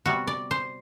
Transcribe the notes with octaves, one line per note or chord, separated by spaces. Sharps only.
C3 G3 B3 F#4
D5
C5